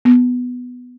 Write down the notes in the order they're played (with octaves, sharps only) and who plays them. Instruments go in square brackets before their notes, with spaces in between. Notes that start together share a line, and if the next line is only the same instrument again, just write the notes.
[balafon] B3